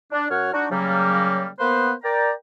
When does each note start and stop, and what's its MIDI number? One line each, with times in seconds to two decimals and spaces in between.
0.13 0.27 62
0.30 0.52 42
0.30 0.52 73
0.30 0.52 78
0.30 0.52 89
0.53 0.66 62
0.53 0.66 63
0.53 0.66 66
0.71 1.47 49
0.71 1.47 54
0.71 1.47 55
0.71 1.47 58
1.60 1.92 58
1.60 1.92 59
1.60 1.92 71
1.60 1.92 72
2.03 2.31 70
2.03 2.31 74
2.03 2.31 79
2.03 2.31 82